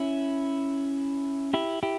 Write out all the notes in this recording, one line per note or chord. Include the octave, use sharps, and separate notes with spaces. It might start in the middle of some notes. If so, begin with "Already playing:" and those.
Already playing: C#4 E4
E4 G4
E4 G4